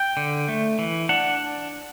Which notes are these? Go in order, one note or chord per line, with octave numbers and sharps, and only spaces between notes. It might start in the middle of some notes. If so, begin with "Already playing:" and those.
Already playing: G5
D3
A3
E3
D4 F#5